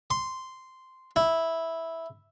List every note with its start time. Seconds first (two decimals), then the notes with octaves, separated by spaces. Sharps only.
0.10 C6
1.16 E4